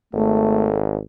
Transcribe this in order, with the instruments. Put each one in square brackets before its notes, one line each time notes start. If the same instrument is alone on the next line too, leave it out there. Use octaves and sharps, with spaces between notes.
[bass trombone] G#1 [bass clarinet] A3 [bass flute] A4